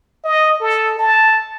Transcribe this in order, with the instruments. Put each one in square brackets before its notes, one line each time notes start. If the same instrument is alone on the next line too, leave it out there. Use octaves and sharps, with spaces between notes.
[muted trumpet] D#5
A4
A5